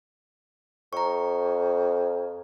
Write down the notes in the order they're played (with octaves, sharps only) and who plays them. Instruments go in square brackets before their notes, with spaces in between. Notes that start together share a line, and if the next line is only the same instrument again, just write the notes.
[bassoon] F2 [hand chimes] A#5 C#6